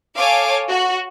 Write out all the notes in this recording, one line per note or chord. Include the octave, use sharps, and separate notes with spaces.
A4 C#5 F5 G#5 D6
F#4